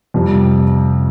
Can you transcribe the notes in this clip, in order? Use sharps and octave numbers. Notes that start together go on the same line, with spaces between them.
F2 C3 G3